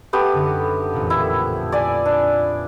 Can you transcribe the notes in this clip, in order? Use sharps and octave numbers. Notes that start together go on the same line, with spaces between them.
A3 B3 G4
F#2 D3 D#4
A1 F2 A#2
E4
D5 G#5 G#6
D4